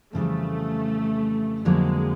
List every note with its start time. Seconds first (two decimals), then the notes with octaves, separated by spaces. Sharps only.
0.13 F2 C#3 E3 G3 A3
1.65 F2 D3 F#3 G#3 A#3